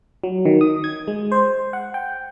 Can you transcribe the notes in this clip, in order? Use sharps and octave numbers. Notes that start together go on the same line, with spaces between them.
F#3
D#3
D#6
G#6
G#3
C5
F#5
G5